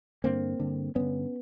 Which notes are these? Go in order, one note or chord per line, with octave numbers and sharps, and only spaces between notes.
G2 D3 A#3 C4
G2 D3
G2 D3 B3 C#4